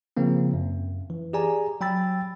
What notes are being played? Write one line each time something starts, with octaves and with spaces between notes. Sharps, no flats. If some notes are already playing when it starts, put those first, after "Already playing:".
C#3 F3 A#3 C4
F#2
E3
G4 G#4 D5 G#5 A#5
F#3 G5 B5 E6 A6